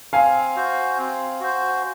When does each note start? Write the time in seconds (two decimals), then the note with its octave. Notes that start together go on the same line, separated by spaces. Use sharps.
0.13 C4 F5 G#5
0.56 F#4 C5
0.98 C4
1.40 F#4 C5